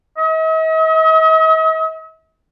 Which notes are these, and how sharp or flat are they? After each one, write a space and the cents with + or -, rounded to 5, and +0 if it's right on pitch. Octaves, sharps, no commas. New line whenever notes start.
D#5 +45